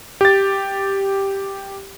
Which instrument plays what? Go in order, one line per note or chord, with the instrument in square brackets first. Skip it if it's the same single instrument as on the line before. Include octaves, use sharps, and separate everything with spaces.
[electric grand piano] G4 A6